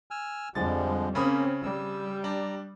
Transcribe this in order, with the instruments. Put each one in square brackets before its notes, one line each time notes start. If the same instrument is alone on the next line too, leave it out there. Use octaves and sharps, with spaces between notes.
[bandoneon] G#5 E6 F6
[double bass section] F2 G3 [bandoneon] D3 F3 G#3 [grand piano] A6
[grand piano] C#3 B5 D#6 [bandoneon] A#3 [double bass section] C4 C#4
[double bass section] G3 [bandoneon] E6
[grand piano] D4 [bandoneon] A#5